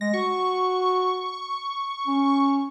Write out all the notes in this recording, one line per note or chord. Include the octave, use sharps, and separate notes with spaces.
G#3 A#6
F#4 C#6
C#4